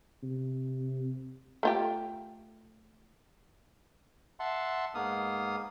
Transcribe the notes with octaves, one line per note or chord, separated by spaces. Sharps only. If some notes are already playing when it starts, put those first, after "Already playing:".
C3
A3 F4 G4
E5 F#5 A5 C6
G#2 A#3 B3 F5 D#6